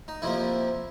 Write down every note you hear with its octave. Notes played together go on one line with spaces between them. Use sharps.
D#4
F2 C3 F3 A#3 E4